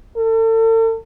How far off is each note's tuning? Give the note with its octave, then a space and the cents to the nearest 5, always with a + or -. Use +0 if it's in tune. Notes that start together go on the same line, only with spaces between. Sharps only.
A4 +40